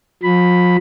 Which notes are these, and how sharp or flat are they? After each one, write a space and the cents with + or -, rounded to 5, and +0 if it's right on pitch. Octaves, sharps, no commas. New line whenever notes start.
F3 +35 B5 +0